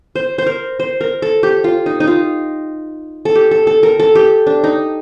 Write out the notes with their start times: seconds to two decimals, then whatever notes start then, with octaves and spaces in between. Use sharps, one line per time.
0.15 C5
0.38 C5
0.47 A#4
0.80 C5
1.01 A#4
1.22 A4
1.43 G4
1.64 F4
1.86 D#4
2.00 D#4
2.07 F4
3.25 A4
3.35 G4
3.51 A4
3.67 A4
3.83 A#4
4.00 A4
4.15 G4
4.47 D4
4.64 D#4